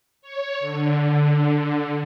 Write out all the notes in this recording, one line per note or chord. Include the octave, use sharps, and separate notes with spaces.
C#5
D3